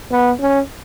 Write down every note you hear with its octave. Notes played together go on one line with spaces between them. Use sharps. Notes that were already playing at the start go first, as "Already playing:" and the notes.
B3
C#4